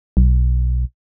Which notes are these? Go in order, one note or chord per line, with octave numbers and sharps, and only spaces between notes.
B1